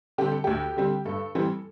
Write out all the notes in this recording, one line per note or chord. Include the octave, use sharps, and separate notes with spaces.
D3 G3 C4 G4
A4
D2 G4
D3 G3 C4
G2 A4
E3 G3 C4